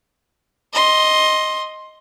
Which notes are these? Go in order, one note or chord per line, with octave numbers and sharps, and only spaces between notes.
D#5 C6